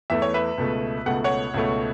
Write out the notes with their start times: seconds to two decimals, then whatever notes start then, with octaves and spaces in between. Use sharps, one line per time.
0.10 E2 E3 A3 E5
0.22 C#5
0.34 B4 E5
0.58 C#2 B2 A3
1.06 C#2 B2 A3 F#5
1.24 C#5 F#5
1.54 C#2 B2 A3